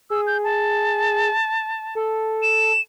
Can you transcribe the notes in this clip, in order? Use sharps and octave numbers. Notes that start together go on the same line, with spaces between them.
G#4 E6
G6
A5
A4
E7